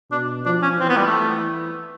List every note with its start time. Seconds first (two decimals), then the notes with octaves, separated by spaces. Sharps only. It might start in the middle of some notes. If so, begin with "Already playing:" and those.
0.11 B2 D4
0.46 F3 D4
0.62 C#4
0.80 E3 C4
0.89 B3
0.97 G3
1.06 A3